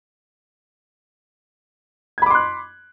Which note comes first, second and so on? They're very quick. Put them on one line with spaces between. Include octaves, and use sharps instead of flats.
G#6 B5 D6 C6 F#6